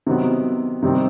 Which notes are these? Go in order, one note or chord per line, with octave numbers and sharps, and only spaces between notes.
C3 D#3 F#3 B3
C3 D#3 G3 C4